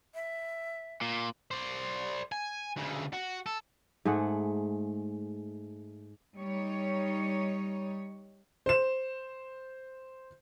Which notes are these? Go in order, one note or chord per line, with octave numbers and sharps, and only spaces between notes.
E5
A#2
C5 D5
G#5
D2 C#3
F#4
A4
G#2 A3 G#4 F#5
G3 D#4 C#5
C5 E7